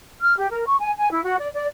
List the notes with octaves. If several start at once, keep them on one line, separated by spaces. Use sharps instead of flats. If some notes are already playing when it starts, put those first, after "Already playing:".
F6
G4
A#4
C#6
G#5
G#5
E4
F#4
D5
D5